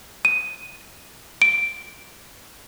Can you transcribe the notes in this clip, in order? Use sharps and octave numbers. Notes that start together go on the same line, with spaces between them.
D#7
D7